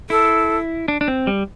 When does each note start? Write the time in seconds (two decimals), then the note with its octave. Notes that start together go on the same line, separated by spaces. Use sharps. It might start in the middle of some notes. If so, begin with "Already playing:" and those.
0.10 E4 A4
0.88 D4
1.01 D4
1.08 C4
1.27 G3